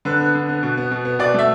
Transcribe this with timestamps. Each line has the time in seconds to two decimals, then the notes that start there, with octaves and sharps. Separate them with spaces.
0.05 D3 B4
0.20 B3
0.34 D3
0.49 B3
0.63 B2
0.77 B3
0.91 B2
1.05 B3
1.19 B2 D5
1.34 A3 E5